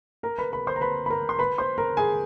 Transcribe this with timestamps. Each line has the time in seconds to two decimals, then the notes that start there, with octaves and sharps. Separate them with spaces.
0.23 A#4 A#5
0.38 B4 B5
0.52 B4 B5
0.67 C5 C6
0.76 A#5
0.81 B4 B5
1.06 B5
1.10 A#4 A#5
1.29 C6
1.39 B4 B5
1.58 C5 C6
1.78 A#4 A#5
1.97 G#4 G#5